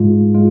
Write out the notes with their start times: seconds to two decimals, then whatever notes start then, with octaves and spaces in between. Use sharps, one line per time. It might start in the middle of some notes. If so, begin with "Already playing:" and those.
Already playing: G#2 G#3 F4
0.34 G#3 F4